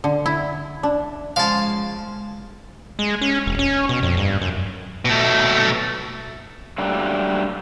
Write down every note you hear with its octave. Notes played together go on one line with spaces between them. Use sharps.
D3
E4
D4
C#3 F3 G#3 C5 F5 A5
G#3
C#4
E1
C#4
B2
F2
G2
F#2
B2 A3
F#3 G3 A3 A#3 D4 D5